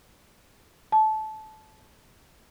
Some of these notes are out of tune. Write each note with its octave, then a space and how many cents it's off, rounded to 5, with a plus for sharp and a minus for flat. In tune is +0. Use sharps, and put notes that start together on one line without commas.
A5 -20